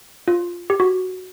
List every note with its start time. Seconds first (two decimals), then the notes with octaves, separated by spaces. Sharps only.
0.28 F4
0.70 G4
0.80 F#4